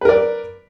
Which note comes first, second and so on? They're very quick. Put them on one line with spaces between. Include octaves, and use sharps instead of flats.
B4 A#4 D5